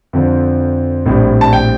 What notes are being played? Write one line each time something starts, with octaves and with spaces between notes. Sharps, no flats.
F2 D3 F3 C4
A#1 A2 G3 C4
A5
G5